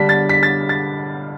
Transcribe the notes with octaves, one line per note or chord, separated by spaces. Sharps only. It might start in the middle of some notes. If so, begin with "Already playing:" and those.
Already playing: D3 G3 D4 B6
A6
B6
A6
A6